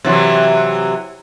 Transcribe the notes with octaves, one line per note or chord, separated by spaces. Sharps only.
C3 E3 F#3